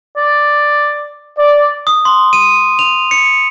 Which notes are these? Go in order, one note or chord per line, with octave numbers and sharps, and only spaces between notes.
D5
D5
D#6
C6
D#7
F7
C#7